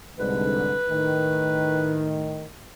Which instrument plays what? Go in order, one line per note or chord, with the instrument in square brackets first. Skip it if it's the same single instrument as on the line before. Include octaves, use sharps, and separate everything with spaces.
[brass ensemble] C2 G#2 D3 [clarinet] B4
[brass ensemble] A2 D#3